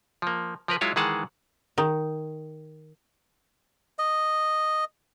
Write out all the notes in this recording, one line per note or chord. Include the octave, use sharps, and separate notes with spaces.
F3 A#3
F3 A#4 B4
F#3 G#3 E4 F4 C#5
D#3 E3 G#3 G#4 F#5 A5
D#3
D#5